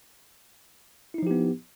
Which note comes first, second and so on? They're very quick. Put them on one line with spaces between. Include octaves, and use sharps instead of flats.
E4 D#4 F3 G4 B3